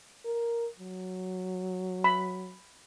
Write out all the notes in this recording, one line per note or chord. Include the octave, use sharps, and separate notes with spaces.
A#4
F#3
B5